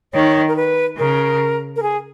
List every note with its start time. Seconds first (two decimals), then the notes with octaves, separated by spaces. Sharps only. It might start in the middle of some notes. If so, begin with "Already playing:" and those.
0.13 D#3 C#5
0.48 A#4
0.56 B4
0.98 C#3 A#4
1.76 A#4
1.83 G#4